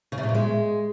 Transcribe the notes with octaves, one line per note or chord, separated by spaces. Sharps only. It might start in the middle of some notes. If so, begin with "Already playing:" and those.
C#3
C3
A2
A#2
G#3